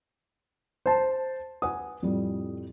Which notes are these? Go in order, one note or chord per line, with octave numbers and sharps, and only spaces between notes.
C5 A5
B4 F#5 G#5 D#6
F2 A2 G3